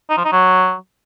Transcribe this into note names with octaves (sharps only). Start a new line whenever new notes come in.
D#4
F3
D#4
F#3